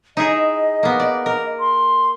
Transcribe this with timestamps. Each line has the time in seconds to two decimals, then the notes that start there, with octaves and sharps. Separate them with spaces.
0.17 D#4 E4 G#4 D#5
0.83 A#3 B3
1.00 D5
1.26 A#4
1.60 C6